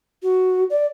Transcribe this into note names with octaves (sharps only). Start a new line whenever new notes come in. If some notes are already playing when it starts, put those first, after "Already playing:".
F#4
D5